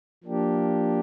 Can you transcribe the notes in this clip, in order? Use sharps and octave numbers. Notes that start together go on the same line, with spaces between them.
F3 A#3 D4 G4